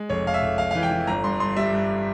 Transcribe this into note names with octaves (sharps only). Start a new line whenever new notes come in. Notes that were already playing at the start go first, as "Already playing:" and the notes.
Already playing: G#3
F1 C#5
F1 F5
E5
F1
F1 F5
E3 F5
G5
E3
G1 A#5
G2 C6
G2 C6
G3 E5
G2